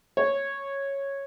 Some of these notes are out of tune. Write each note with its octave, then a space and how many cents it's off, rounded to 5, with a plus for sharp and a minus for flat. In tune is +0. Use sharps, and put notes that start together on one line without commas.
C#5 -5